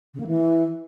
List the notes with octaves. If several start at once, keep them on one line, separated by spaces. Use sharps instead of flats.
C#3
A#3
E3